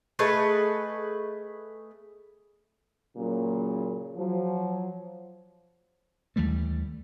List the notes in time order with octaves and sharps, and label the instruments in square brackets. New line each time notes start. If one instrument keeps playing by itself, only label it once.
[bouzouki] A3 G#4 B4 D#5
[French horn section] A#2 C#3 F#3 A#3
F3 F#3
[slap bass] D#2 E3 G3 A3